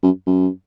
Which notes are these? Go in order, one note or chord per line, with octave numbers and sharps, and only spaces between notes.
F#2
F#2